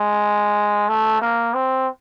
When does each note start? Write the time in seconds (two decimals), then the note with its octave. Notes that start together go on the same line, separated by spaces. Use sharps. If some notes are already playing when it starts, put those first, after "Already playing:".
Already playing: G#3
0.89 A3
1.21 A#3
1.54 C4